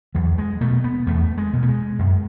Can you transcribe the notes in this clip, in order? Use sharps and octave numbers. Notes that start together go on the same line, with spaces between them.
E2 F#3
G#3
B2 A3
B3
E2 A3
G#3
B2
A3
G#3
F#2